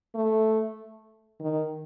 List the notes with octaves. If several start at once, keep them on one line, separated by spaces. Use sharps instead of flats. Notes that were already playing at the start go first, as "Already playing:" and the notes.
A3
D#3